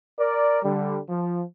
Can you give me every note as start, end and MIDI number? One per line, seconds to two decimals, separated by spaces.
0.18 0.62 70
0.18 0.62 74
0.63 0.99 50
0.63 0.99 55
1.09 1.42 53